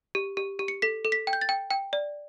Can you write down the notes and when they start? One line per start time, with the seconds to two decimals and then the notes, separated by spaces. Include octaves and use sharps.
0.15 G4
0.37 G4
0.59 G4
0.68 C#7
0.82 A4 B6
1.05 A4
1.12 B6
1.27 G5
1.33 G6
1.41 A6
1.49 G5
1.71 G5
1.93 D5